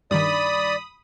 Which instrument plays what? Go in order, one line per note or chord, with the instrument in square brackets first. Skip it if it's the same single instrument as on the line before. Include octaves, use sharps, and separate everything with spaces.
[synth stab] G2 D#3 [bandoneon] D5 [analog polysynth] B5 D#6